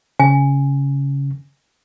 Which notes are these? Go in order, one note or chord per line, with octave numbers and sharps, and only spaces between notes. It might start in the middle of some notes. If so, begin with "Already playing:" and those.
C#3 G#5